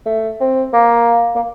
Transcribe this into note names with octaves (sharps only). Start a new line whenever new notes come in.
A3
C4
A#3
A#3